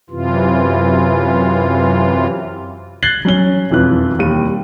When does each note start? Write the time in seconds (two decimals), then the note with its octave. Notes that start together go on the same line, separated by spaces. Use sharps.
0.10 F#2 C3 E3 F4
3.03 F#6 G#6 A6 C7 F#7 G7
3.25 F#3 C#4 G7
3.70 E1 F2 E3 F#6
4.19 D#2 G3 D#7